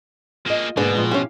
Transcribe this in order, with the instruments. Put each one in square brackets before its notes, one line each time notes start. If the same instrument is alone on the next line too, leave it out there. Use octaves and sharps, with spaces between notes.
[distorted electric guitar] A#3 G#4 [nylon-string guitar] F4 D#5
[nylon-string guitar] G#2 D3 A#3 [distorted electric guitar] B2 [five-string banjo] D4 G#4 B4
[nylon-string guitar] A#2 F3 G#3
[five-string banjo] F3 C#4 [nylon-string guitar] E4 G4 F5